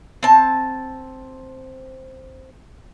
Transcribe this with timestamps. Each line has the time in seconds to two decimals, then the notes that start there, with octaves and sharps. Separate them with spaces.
0.23 C4 A5